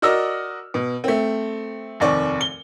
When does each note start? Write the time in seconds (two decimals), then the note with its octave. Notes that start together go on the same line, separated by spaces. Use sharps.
0.02 F#4 A#4 D5 D#5 E6 F6
0.74 B2
1.04 A3 C4
2.00 F1 D#2 C4 D5 C#6
2.41 G7